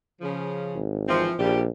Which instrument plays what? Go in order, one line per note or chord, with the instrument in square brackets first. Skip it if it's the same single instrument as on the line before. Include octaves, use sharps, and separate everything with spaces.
[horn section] C#3 F3
[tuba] G#1
[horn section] E3 F3 C4
[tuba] A#1 [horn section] F3 G3 G4